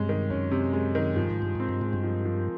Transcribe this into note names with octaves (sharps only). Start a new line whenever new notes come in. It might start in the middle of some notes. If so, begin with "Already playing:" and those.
Already playing: G2 C3 G#3 C#4
D#3
F#2 C#4
C3
G#3
D#3
G2 F3
G#2
G2 F3
G#2 C4
G2
G#2 G#3
G2
F3
F3